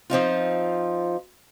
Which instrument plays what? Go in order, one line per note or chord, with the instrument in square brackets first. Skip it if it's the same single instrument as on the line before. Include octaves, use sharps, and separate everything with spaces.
[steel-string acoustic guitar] F3 C4 D#4 F4